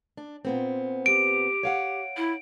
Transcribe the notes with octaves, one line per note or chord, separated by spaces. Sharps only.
D4
A#2 B3 C4
G4 D7
C#5 F5 F#5
E4